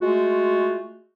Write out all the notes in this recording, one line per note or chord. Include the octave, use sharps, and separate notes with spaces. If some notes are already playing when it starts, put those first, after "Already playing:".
G#3 A3 F4 F#4